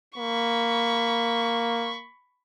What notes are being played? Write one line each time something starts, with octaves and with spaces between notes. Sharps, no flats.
A#3 B5 C#6